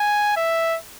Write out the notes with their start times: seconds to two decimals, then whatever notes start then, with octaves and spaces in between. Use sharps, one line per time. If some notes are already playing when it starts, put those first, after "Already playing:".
Already playing: G#5
0.37 E5